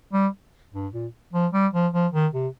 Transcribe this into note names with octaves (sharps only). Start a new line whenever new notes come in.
G3
G2
A#2
F3
G3
F3
F3
D#3
C3